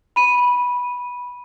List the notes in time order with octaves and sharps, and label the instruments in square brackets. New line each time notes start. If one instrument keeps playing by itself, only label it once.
[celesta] B5 D#7